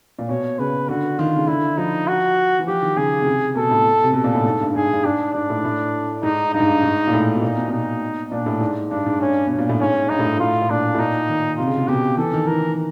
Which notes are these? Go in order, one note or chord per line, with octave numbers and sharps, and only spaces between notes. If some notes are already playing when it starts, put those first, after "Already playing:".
A#2
B2 C#5
C#3 B4
D3 F#4
D#3 F4
C#3
D3 E4
F3 D#4
F#4
E3
F3 G4
D#3
C#3 G#4
C#3
C3
B2 A4
A2
C3
B2 A4
A#2
A2
G#2
G2
G#2 G#4
G2
G#2 D4
G#2 D4
A2
A2
G#2 D#4
G2 D#4
G#2
G2
G#2
A#2
A2
B2
A#2 D#4
B2
A#2
B2 D#4
A#2 D4
A2
G#2
G2 D4
G#2
G2 C#4
B2
A#2
A2
G#2 C#4
G2 D#4
A2
G#2
A2 F4
A2
A#2 D4
A2
A#2 D#4
D#3
C3 F4
C#3
C3
B2 G4
E3 A4
D#3
E3 A#4